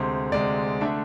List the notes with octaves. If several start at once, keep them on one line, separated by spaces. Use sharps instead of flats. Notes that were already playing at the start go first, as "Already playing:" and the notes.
Already playing: D2 C3 G#3 C4 C5
D2 C3 G#3 C4 D5
D3 A3 D4 E5